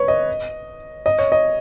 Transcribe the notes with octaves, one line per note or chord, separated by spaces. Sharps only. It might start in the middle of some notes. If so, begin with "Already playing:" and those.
Already playing: B4 C#5
D#5
D#5
C#5
D#5